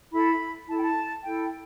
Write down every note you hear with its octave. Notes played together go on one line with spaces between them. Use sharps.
E4 A4 B5
E4 A4 G5 A5
A5
E4 A4 G5